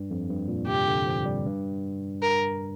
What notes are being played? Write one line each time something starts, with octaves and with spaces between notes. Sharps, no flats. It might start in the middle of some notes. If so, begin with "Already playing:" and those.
Already playing: G2
F2
G2
A#2
C3 G4
D3
F3
G3
G2
A#4